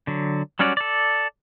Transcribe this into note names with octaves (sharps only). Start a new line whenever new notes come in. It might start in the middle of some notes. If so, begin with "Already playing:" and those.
D3 F#3
F#3 G3 C#4 F#4 D5
A4 D5